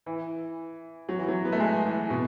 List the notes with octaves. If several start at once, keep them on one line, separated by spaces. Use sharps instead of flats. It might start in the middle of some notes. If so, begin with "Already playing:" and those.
E3
F#3
E3
F#3
B3
A3
G#3
E3
B2